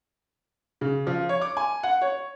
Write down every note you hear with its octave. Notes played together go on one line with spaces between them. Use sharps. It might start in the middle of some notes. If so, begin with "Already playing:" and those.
C#3
F3
C#5
D6
G#5
F#5
C#5